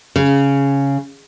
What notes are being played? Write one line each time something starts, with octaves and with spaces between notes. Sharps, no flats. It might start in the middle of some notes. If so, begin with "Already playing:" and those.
C#3